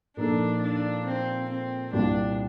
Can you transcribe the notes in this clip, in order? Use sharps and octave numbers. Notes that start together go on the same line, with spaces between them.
A#2 F3 A#3 D4 D#4 A4
D4
C4
C4
C2 A#2 G3 D4